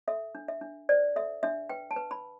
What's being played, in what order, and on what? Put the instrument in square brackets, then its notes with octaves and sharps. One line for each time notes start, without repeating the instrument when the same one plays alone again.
[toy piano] A4 E5
D4
E5
D4
C5 D5
A4 E5
D4 E5
B4 G5
A5
B4
B5